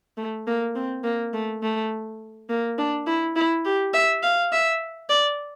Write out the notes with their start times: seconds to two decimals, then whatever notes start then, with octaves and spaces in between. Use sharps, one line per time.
0.17 A3
0.47 A#3
0.75 C4
1.04 A#3
1.33 A3
1.63 A3
2.49 A#3
2.78 D4
3.07 E4
3.36 E4
3.65 G4
3.94 E5
4.23 F5
4.52 E5
5.10 D5